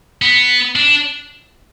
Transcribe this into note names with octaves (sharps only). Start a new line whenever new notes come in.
B3
D4